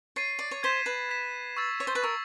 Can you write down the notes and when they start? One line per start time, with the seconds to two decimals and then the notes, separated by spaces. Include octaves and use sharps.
0.16 C#5 A6 C7 D#7
0.39 D5
0.51 C#5
0.63 C5 G#6 B6 E7
0.86 B4
1.09 G#6 B6 E7
1.57 C#6 E6 A6
1.80 C#5
1.87 C5
1.95 B4
2.03 A#4 C#6 E6 A6